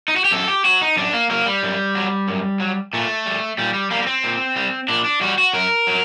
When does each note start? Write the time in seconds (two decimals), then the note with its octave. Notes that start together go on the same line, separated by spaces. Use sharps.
0.08 D#4
0.16 F#4
0.25 G4
0.31 F#2 A4
0.48 G4
0.65 F#3 F#4
0.81 D#4
0.97 F#2 D4
1.13 A#3
1.30 F#3 A#3
1.46 G3
1.63 F#2
1.95 F#3
2.28 F#2
2.60 F#3
2.93 A#2 A3
3.26 G3
3.58 A#2 G3
3.74 G3
3.90 G3 A#3
4.02 A#3
4.07 C4
4.24 A#2
4.56 G3
4.88 A#2 D4
5.05 D4
5.21 G3 F#4
5.38 F#4
5.53 F#2 A#4
5.87 F#3